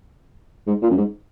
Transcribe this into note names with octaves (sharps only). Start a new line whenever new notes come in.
G#2
A#2
F#2
G#2